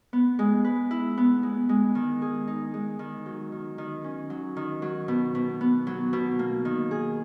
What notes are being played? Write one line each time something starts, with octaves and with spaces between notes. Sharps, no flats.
B3
G#3
B4
E4
B3
G#3
G#3
D#3
G#4
D#4
G#3
D#3
F#3
D#3
D#3
C#4
F#3
D#3
F#3
B2
B2
B3
F#3
B2
A#3
D#3
G#4